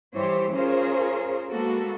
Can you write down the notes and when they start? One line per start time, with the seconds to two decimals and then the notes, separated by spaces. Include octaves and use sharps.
0.16 G2 E3 G4 C5 C#5
0.54 C#4 F4 G#4 A#4 C5 C#5
1.51 G#3 A#3 B3 F#4 A4